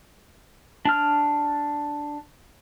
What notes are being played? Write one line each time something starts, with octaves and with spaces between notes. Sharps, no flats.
D4 F6